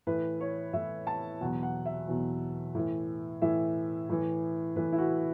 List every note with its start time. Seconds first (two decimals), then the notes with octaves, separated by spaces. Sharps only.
0.07 A2 E3 B4
0.41 C#5
0.73 A2 E3 E5
1.07 A5
1.41 E2 B2 F#3 F#5
1.63 F#5
1.86 E5
2.08 E2 B2 F#3
2.75 A2 E3
3.42 A2 E3 E5
4.09 A2 E3
4.76 A2 E3 B4
4.92 E4
4.98 F#4